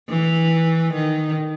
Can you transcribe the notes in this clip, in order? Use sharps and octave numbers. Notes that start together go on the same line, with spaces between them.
E3
D#3